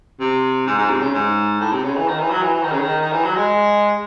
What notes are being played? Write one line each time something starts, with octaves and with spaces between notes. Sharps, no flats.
C3
G#2
G#2
C3
C#3
G#2
A2
C3
C#3
E3
D#3
E3
F#3
E3
E3
D#3
C#3
D#3
D#3
E3
F#3
G#3